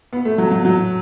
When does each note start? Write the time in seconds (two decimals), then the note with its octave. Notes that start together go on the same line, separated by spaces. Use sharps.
0.13 B3
0.25 A3
0.38 F#3
0.51 F#3
0.65 F#3